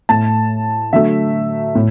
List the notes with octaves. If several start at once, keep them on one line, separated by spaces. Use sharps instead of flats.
A2 A3 A5
D3 F#3 A3 E5
A2